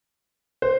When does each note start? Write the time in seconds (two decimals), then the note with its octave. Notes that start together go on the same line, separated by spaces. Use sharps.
0.62 C5